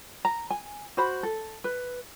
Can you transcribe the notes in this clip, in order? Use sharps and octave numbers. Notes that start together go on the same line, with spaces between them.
A#5
G#5
F#4 C5 B5
A4
B4